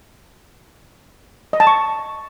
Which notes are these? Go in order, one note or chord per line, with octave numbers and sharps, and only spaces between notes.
D#5
A5
C#6